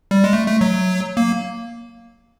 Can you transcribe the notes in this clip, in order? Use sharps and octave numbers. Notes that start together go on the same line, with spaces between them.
G3
G#3
A3
A3
F#3
A#3